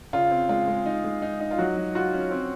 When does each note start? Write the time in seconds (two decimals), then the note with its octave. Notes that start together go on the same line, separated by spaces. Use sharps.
0.13 C#3 F4
0.31 C4
0.49 G#3 F4
0.68 G#3
0.86 D#4
1.04 G#3
1.22 D#4
1.40 D#4
1.51 F4
1.58 F#3 F#4
1.77 F#3
1.95 F4 F#4
2.14 C#4
2.31 C4